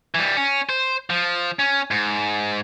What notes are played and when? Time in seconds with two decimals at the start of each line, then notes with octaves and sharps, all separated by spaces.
0.15 E3 G3
0.37 C#4
0.69 C5
1.10 F3
1.59 C#4
1.91 G#2